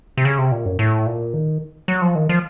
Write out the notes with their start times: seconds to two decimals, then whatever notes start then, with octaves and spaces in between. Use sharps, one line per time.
0.17 C3
0.25 C#3
0.38 C3
0.52 A#2
0.65 F#2
0.79 A2
1.07 A#2
1.34 D#3
1.88 F#3
2.02 F3
2.15 D#3
2.29 F3